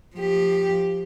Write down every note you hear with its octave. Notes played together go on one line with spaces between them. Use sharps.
F3 G4